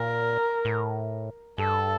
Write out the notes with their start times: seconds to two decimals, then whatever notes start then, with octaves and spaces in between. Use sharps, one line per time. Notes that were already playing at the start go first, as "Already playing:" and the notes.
Already playing: A#2 A#4
0.65 A2
1.58 G2 A4